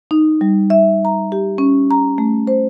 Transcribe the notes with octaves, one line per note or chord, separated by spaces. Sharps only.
D#4
G3
E5
A#5
G4
C#4
A#5
A3
C5